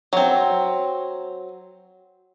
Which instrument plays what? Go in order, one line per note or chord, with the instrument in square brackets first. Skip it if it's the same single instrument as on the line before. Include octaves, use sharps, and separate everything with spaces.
[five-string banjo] F#3 C4